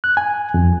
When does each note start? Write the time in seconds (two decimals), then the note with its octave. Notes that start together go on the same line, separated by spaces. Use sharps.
0.04 F#6
0.17 G#5
0.54 F2